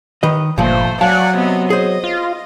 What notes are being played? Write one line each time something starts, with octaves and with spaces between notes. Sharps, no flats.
D#3 B4 D#5
G1 A#2 F3 A3 C5
F#3 D5 F5 F#5 G#5 A5
C3 B3 D#5
G#4 C5 D#5
F4